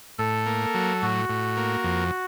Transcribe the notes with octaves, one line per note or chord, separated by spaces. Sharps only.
A2 A4
A#3
F#3
A2 F#4
A2
A#3
F2